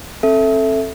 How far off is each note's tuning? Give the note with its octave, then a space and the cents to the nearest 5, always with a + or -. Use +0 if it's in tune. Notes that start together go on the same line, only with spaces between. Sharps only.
C4 +35 A4 +0 E5 +0